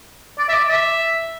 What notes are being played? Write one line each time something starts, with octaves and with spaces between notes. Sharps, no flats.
D5
E5
D5
E5